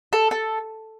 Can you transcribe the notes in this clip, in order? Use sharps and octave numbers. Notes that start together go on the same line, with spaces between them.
A4
A4